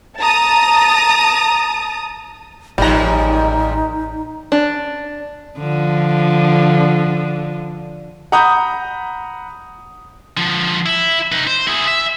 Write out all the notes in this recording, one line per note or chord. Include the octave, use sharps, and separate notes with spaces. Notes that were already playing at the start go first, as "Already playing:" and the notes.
A5 A#5 D#6
A1 D#2 G#2 F3 G3 D#4 A#5
D4
D3 F3
F#5 A#5 B5 D#6 G6
D3 F3
E4
D#4 B4
C5
E4 G#4
E5